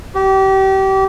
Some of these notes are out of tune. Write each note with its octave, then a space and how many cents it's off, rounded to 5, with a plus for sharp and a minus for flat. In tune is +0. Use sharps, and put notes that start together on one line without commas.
G4 -30